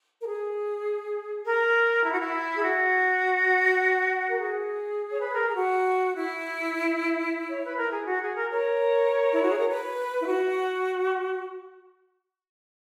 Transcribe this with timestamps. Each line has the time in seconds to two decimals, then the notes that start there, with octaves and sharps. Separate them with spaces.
0.20 A#4
0.27 G#4
1.45 A#4
2.04 E4
2.11 F#4
2.19 E4
2.57 G#4
2.62 F#4
4.27 A#4
4.39 G#4
5.11 C#5
5.22 B4
5.33 A#4
5.46 G#4
5.56 F#4
6.15 E4
7.50 C#5
7.64 B4
7.78 A#4
7.92 G#4
8.06 F#4
8.21 G#4
8.36 A#4
8.50 A#4 C#5
9.31 E4
9.41 F#4
9.50 G#4
9.59 A#4
9.69 B4
10.21 E4
10.27 F#4